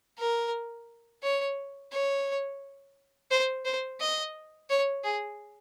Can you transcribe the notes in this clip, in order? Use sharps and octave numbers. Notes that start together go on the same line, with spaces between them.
A#4
C#5
C#5
C5
C5
D#5
C#5
G#4